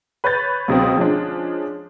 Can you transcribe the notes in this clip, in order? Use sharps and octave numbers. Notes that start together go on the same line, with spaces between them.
B4 C#5 B5 G6 A6
C#2 B2 F#3 C4
F3 G#3 C#4 D4